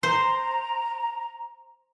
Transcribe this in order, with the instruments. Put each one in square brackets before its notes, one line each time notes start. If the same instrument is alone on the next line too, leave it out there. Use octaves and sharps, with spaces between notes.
[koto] C5 [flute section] A#5